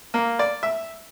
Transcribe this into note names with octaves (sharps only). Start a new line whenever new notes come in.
A#3
D5
E5